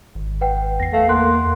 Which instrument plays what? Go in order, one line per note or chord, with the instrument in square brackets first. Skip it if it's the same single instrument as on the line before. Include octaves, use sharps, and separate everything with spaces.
[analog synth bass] G#1
[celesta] B4 F#5 G5
[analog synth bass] E2 [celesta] A#6 C7
[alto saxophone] A3 [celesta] F5
[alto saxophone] A#3 [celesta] F#5 C6 F#6